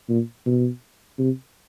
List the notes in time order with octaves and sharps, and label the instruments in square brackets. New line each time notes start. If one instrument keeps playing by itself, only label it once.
[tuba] A#2
B2
C3